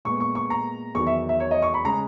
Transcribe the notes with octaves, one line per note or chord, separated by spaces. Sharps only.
A#2 G#3 B3 C#6
C#6
C#6
A#5
E2 D#3 F#3 C#6
E5
E5
C#5
D#5
C#6
B5
C#3 G#3 A#5